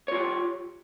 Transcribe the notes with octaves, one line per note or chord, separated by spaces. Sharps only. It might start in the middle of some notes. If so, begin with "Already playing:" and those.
F4 G4 C#5